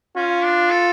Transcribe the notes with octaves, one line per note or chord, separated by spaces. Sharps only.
C#4 F4
D4
A4